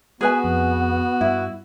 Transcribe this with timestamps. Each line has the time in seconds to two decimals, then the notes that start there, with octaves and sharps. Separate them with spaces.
0.21 B3 F#4 G#4 B4 G#5
0.44 F2
1.21 G2 E4